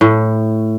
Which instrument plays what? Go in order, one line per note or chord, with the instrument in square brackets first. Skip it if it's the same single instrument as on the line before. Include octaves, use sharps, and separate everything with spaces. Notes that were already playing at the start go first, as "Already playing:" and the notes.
[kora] A2